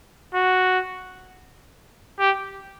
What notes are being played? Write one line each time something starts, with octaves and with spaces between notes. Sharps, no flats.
F#4
G4